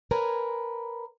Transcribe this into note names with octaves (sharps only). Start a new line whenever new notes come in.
A#4 B4 C#5 G#5 A#5